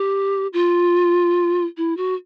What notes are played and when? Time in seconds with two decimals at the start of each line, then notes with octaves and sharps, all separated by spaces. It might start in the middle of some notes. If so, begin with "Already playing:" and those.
Already playing: G4
0.53 F4
1.77 E4
1.97 F#4